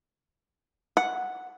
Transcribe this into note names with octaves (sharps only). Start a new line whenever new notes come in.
F#5